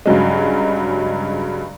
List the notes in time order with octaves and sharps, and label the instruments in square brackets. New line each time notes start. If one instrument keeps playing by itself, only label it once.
[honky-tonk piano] G2 C#3 F#3 G#3